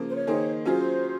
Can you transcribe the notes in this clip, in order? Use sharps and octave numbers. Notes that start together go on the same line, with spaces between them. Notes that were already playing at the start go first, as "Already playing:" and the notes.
Already playing: C#3 F3 A#3
C5
C#5
D#3 A#3 D#4 G#4 C5
F#3 C#4 F4 G#4 C5